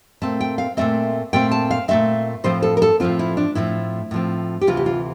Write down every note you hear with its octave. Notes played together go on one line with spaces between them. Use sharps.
A#2 A3 C4 A5
G5
F5
A#2 A3 C4 E5
A#2 A3 C4 G5
A5
F5
A#2 A3 C4 E5
A2 F3 C4 C5
A4
A#4
A4
A2 F3 C4 F4
E4
D4
A2 F3 C4 E4
A2 F3 C4
G4
D2 C3 E3 F4
G4
F4